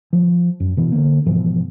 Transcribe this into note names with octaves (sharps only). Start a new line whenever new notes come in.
F3
F#2
B2 E3
D3 A#3
G#2 B2 E3 F3